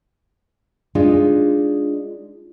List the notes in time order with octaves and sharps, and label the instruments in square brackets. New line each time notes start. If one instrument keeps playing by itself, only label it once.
[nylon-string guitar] G#3 D4 D#4 F4